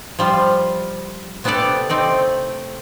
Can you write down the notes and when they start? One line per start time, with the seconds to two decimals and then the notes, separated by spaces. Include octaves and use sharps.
0.19 F3 G3 F4
1.44 C3 B3 D4 G4 A4 D5
1.89 A3 C4 D#4 D5